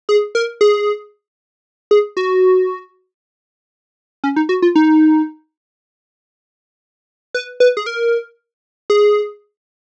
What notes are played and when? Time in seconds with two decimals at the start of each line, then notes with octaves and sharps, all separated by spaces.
0.09 G#4
0.35 A#4
0.61 G#4
1.91 G#4
2.17 F#4
4.24 C#4
4.36 D#4
4.49 F#4
4.62 F4
4.75 D#4
7.34 B4
7.60 B4
7.77 G#4
7.86 A#4
8.90 G#4